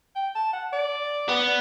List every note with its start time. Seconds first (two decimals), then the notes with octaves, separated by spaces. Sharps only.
0.16 G5
0.35 A5
0.53 F#5
0.73 D5
1.29 B3